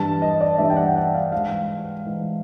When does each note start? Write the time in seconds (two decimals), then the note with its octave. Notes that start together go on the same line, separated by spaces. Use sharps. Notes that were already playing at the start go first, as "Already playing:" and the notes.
Already playing: G2 E3 A5
0.22 D#5
0.41 D5
0.58 G2 E3 E5
0.70 G5
0.77 F#5
0.88 G5
0.96 F#5
1.14 F5
1.32 G#2 E3 F5
2.06 G#2 E3